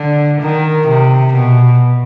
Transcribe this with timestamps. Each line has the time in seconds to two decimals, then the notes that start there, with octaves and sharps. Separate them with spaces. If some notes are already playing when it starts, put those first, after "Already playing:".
Already playing: D3
0.40 D#3
0.87 C3
1.34 B2